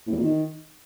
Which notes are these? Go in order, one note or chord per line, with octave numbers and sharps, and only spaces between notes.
A2
E2
A#2
D#3